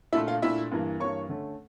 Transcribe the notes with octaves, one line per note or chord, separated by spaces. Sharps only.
A#2 A3 D4 E4 E5
F4 F5
A#2 A3 D4 E4 E5
G2 E3 A#3
G2 E3 A#3 C#5 C#6
D3 A3 C#4